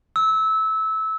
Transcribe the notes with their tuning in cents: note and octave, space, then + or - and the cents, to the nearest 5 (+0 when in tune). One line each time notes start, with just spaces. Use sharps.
E6 -20